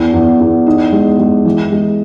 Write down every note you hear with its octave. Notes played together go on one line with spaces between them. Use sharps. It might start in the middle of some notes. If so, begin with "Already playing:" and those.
Already playing: E2
E2
E2
D#4
G#3
G#3
E3
G#3